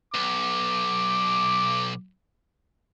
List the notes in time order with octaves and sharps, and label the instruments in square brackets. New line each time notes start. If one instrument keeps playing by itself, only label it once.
[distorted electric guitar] B1 [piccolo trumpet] D6